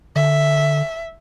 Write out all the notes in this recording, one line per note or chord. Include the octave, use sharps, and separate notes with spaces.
D3 E5